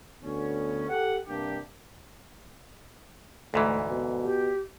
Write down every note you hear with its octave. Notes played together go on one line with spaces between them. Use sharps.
D2 B3 C#4
G4 A4 F#5
G2 C3 G3 A#3 D4 G4
D2 G#2 E3 A3
B2
G4